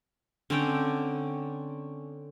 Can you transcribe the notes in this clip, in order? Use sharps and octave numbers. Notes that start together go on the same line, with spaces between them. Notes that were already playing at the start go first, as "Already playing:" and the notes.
D3 C4 C#4 G5